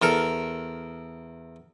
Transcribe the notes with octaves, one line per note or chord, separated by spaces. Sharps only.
E2 A4 A#4